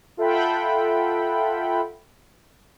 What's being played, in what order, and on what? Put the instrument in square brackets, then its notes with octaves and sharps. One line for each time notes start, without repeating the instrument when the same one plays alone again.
[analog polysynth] F4 A4 E5 F#5 G5 B5